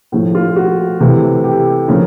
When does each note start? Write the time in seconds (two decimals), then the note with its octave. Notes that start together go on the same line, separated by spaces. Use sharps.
0.12 A2 F3 A3
0.35 F4
0.56 F#4
1.00 C3 E3 A3
1.44 G4
1.88 C#3 F3 A#3